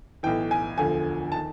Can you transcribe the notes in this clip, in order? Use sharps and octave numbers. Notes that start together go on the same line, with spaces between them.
B1 A2 E3 G5
G#5
E1 D2 D3 F3 G#5
D#3 A5